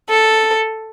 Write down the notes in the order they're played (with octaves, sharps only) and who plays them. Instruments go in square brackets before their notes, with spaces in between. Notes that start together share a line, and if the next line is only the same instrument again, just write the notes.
[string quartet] A4